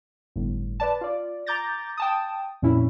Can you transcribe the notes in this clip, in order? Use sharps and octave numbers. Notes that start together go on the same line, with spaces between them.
G1 A2
B4 D5 A5
F4 D5
A#5 D6 G6 A6 A#6
G5 A5 D#6
F2 A#2 C#4 E4